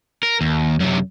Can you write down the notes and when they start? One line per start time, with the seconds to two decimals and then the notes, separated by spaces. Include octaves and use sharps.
0.23 A#4
0.41 D#2
0.80 F#2 C3